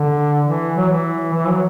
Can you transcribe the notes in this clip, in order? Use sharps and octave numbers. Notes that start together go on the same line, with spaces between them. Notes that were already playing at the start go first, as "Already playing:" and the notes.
Already playing: D3
E3
F#3
E3
E3
F#3